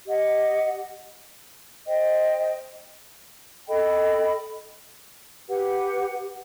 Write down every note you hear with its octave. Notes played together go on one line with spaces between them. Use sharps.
G4 D#5 F#5
C5 D#5 G5
A4 D#5 G5 B5
G4 B4 F#5